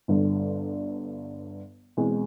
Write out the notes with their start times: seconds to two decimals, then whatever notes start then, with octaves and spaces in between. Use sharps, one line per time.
0.08 G1 G2 D3
1.97 E1 E2 B2 G#3 C4